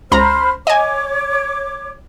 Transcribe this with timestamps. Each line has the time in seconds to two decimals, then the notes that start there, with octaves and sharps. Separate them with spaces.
0.12 C#2 C5 A#5 B5 F6
0.67 C#5 D#5 G#5 D6